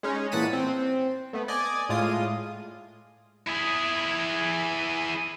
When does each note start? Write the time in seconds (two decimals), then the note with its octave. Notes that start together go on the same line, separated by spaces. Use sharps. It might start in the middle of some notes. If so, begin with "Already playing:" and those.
0.03 G#3 C#4 D#4
0.32 A#2 E3 F#5 A5 B6 D#7
0.53 C4
1.33 A3 B3
1.48 D5 D#5 G#5
1.89 A2 G#3 F4 D#6
3.47 E4 G#4